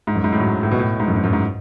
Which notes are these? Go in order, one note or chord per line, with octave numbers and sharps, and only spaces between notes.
G#2
F#2
G#2
A2
F#3
A2
B2
A2
G#2
F#2
G#2
F#2
G#2